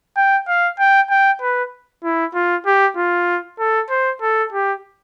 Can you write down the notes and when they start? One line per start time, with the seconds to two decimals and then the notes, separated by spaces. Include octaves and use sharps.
0.17 G5
0.48 F5
0.79 G5
1.10 G5
1.42 B4
2.04 E4
2.34 F4
2.66 G4
2.97 F4
3.59 A4
3.90 C5
4.22 A4
4.52 G4